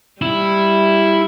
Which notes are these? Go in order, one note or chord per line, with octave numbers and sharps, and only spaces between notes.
G3 E4